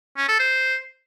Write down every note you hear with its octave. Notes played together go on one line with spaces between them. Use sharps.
C#4
A4
C5